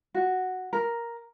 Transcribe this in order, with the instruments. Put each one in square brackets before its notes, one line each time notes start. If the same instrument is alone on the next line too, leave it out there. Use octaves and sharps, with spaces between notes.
[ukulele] F#4
A#4